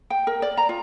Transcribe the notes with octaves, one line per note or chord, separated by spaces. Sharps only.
G5
A#4
D5
A#5
F4